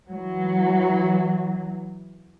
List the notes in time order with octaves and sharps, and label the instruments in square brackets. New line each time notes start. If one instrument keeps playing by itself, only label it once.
[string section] E3 F#3